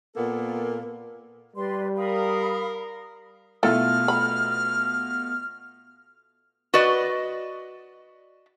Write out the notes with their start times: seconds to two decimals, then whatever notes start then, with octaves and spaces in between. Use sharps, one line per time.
0.16 A#2 A#3 B3 A4
1.56 G3 B4 D5 C6
1.97 A#4 F5 B5 D#6
3.63 B2 A3 E4 F4 A4 F6
4.08 B5
6.74 F#4 B4 D5 D#5